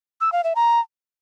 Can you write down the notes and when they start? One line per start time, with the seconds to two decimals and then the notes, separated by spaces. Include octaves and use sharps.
0.21 E6
0.32 F5
0.44 E5
0.55 A#5